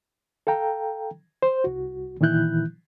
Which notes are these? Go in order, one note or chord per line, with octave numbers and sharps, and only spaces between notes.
A4 F5 G5 A#5
C5
C2 F#4
A#2 D#3 E3 E4 F#6 G6